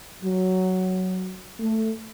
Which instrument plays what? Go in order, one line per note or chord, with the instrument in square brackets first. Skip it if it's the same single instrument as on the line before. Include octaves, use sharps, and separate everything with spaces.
[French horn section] F#3
A3